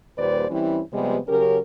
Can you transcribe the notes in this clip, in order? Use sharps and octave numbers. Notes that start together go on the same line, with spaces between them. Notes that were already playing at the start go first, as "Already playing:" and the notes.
D#2 A#2 G3 B4 C5 D5
E3 G3 C4 C#4 E4
C3 F3 G3 G#3 B3
C#3 F#3 C#4 G4 A#4